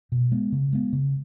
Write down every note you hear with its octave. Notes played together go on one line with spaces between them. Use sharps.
B2
G#3 B3
C#3
G#3 B3
C#3